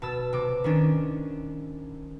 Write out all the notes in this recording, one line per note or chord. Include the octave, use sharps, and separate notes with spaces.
B2 A5 E6
C3 D6
D#3 C#4 D4